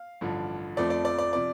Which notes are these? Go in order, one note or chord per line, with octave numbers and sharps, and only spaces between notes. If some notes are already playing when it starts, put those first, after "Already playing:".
Already playing: F5
A1 G2 D3 F3
F1 F2 F3 A3 C4 D5
D5
D5
D5
C3 F3 D5